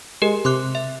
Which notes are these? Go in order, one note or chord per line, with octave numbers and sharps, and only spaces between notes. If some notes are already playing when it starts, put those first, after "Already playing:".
G#3 G4 A#4
C3 C6 D6 F#6
E5